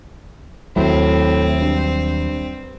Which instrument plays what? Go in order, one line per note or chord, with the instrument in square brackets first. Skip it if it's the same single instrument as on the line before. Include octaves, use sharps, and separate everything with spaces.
[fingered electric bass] D#2 F#3 [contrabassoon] A2 [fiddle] C4
[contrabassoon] G2